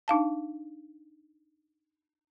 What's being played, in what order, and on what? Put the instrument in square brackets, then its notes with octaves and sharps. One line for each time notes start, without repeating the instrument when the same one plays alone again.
[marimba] D4 D#4 F5 A5